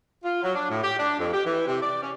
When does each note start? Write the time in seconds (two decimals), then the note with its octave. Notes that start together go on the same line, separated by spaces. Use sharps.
0.24 F4
0.43 F#3
0.55 D4
0.70 A2
0.83 G4
0.99 D4
1.19 F2
1.33 G4
1.46 E3
1.67 C3
1.82 D5
2.02 C#4